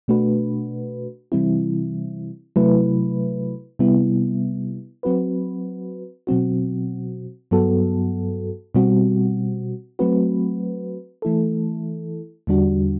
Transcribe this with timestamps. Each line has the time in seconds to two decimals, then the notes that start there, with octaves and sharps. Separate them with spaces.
0.08 B2 A3 D4 F#4 B4
1.32 C3 E3 G3 C4 E4
2.56 C3 F#3 A3 E4 B4
3.79 C3 G3 B3 E4
5.03 F#3 C4 F#4 B4
6.27 B2 F#3 C4 F#4
7.51 G2 F#3 B3 F#4 A4
8.75 B2 G3 C4 F#4
9.99 F#3 A3 C4 F#4 B4
11.22 E3 A3 E4 A4
12.47 E2 D3 G3 D4 F#4